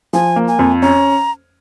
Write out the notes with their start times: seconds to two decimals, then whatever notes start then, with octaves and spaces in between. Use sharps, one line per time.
0.13 F3 G#5
0.36 A#3
0.48 G#5
0.59 F2
0.82 C#4 A#5